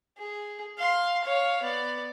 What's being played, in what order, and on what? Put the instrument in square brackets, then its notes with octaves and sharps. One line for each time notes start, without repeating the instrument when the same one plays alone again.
[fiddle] G#4
F5 C6
C#5 F5
B3 D5